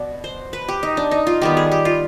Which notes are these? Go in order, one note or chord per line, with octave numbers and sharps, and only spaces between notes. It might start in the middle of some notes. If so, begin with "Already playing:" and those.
Already playing: B2 D5
C5
B4
G4
D#4
D4
D#4
F4
D#3 G3 B3 G4
G#4
G4
F4